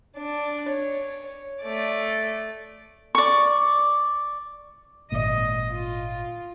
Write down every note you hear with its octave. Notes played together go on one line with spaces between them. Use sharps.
D4
C#5
A3 D5
D5 C#6
G#1 A#2 D#5
F4